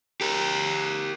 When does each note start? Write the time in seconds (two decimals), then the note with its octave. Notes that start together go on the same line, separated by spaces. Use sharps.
0.21 G4 A#4